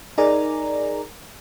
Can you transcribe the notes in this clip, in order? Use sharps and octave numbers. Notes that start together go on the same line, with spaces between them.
D#4 G#4 A#4 D5 G#5 A#5